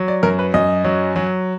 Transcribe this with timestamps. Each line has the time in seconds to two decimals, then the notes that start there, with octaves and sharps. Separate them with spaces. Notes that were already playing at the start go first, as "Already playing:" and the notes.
Already playing: F#3
0.08 D5
0.23 F#2 A#4
0.39 B4
0.54 F#2 D#5
0.84 F#3
1.16 F#3